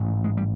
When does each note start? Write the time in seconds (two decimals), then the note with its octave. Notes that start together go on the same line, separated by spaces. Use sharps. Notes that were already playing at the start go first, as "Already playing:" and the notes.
Already playing: A1 G#2
0.24 G#3
0.37 G3